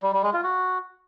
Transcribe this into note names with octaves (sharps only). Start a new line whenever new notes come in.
G3
G3
G#3
F4
F#4